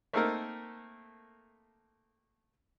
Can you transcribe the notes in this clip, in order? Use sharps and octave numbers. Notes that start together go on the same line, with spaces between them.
A3 A#3 C4 D#4 A4 A#4